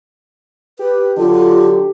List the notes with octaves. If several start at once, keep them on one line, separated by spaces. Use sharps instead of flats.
G4 B4
D3 F#3 F4 A4